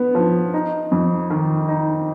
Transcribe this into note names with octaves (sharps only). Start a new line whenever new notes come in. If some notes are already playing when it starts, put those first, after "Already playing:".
Already playing: B3
F3
D#4
F2
D#3
D#4